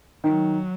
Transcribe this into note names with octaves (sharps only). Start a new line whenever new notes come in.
D#3 F#3